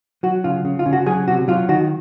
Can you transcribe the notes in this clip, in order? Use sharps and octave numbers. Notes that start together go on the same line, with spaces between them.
F#3 F#4
C#3 F4
C#3
F4
C#3
F#4
F#3 G#4
C3 F#4
F#3 F4
D#3 F#4